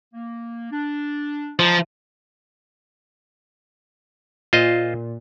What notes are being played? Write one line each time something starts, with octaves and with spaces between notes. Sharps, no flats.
A#3
D4
F3 D#5 A5 A#5
A#2 F4 C5 D#5